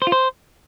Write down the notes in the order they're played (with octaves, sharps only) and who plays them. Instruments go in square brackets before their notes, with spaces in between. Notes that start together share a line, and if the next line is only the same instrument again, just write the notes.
[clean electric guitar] C5
F4
C5